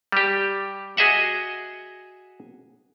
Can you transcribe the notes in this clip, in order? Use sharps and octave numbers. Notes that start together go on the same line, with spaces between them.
G3 G4
F#4 G#4 D#5 E5 F#5